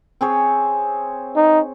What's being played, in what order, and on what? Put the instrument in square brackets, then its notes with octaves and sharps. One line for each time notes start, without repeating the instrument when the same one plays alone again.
[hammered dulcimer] C4 G#4 C#5
[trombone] D#4